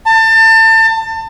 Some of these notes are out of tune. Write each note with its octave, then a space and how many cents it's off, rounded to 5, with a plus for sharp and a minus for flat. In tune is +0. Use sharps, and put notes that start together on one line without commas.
A5 +30